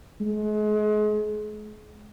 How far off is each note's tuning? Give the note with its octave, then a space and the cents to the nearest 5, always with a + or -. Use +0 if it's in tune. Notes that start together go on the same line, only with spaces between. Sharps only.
G#3 +35